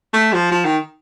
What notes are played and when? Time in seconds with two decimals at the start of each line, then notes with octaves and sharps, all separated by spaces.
0.13 A3
0.33 F3
0.52 F3
0.65 D#3